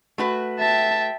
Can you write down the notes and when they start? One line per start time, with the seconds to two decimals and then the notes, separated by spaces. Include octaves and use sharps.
0.18 A3 F#4 B4
0.59 E5 G5 A5